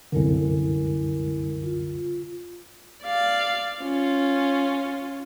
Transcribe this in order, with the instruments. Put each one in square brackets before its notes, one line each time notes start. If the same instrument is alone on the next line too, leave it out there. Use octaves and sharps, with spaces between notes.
[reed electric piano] C2 F#2 D3 [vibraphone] G#3 E4 A#4
[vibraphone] F4
[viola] D5 F5
C#4 F4